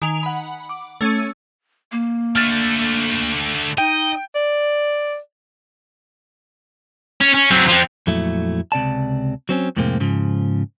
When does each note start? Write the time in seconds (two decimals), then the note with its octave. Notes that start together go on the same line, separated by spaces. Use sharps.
0.02 D#3 G#5 F7
0.23 F#5 B5
0.69 D6
1.01 A3 C#4 E6 D#7
1.92 A#3
2.36 D3 A3 F6 A6
3.78 D#4 D#5 G5
4.35 D5
7.20 C#4
7.34 C#4
7.51 F#3 C4
7.68 F3 C4
8.07 F2 A#2 F#3 A3 E4
8.72 C#2 C3 D5 A5
9.49 F#3 C4 C#4
9.77 F2 A2 C3 G#3 A#3 C4
10.00 G#2 C#3 F3